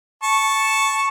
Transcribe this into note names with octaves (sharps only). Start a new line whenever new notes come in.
A5 C#6